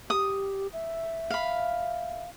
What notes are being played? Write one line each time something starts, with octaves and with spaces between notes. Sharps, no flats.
G4 D#6
E5
F5 B5